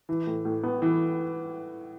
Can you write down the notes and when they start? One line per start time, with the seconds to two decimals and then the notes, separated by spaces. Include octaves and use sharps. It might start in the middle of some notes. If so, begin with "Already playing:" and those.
0.09 E3
0.27 A2
0.45 A2
0.63 B3
0.82 E3